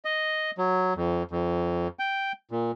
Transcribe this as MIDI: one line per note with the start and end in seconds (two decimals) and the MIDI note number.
0.05 0.51 75
0.58 0.93 54
0.96 1.23 41
1.31 1.88 41
1.99 2.32 79
2.51 2.71 46